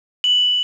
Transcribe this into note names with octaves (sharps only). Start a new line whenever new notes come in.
F#7